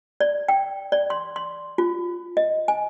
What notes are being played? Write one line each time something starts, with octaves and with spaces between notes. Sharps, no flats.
D5
G5
D5
C6
C6
F4
D#5
G#5